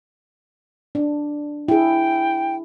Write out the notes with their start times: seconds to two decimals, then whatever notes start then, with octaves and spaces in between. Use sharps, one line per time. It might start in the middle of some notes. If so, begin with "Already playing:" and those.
0.95 D4
1.68 E4 G#4 G5